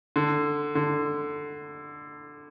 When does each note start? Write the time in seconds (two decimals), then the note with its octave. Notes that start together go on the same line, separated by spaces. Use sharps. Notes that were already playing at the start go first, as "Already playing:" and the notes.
0.16 D3
0.75 D3